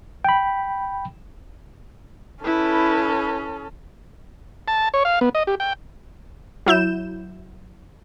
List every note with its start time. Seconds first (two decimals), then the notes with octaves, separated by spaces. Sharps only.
0.25 G5 B5
2.44 C#4 E4 A4 B4
4.68 A5
4.94 C#5
5.05 F5
5.21 B3
5.35 D#5
5.47 G4
5.60 G5
6.66 F#3 E4 G6 E7